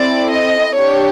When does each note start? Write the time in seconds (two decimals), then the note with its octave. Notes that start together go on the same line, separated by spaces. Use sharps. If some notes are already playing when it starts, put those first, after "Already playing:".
Already playing: C4 E4 A4 D5
0.32 D#5
0.75 D4 G4 C#5